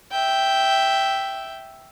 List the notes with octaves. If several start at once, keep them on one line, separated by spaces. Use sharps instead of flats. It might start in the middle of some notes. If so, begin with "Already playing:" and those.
E5 G5